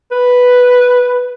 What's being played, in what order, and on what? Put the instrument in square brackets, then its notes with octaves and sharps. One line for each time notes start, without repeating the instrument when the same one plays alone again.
[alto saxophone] B4